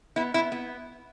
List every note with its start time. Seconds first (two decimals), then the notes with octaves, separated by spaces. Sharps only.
0.16 B3 E4
0.34 B3 E4
0.52 B3